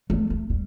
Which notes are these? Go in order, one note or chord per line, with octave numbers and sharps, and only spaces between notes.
A3
A3
G3